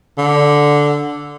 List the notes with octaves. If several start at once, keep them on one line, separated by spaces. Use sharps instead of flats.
D3